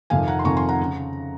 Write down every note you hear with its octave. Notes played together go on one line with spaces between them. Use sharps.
F2 C3 D#3 F5 G#5
F#5 A#5
C6
F2 C3 D#3 A#5 C#6
G#5 C6
F#5 A#5
C#3